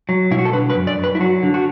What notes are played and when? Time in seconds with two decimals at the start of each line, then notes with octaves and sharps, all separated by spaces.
0.09 F#3
0.31 B2 E4
0.39 F#4
0.45 A4
0.53 D3 B4
0.70 B4
0.76 F#2
0.87 D5
0.98 F#2
1.04 B4
1.15 E4
1.20 F#3 F#4
1.43 D3
1.54 F#4